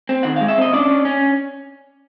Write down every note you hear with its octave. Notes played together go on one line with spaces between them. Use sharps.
C4
D#3 F#5
G#3 F5
E5
C4 D#5
C#4 D4 D5
C#4
C#4